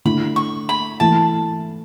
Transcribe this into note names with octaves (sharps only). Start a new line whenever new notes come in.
D3 A3 E4 B5
C#6
B5
E3 A3 E4 A5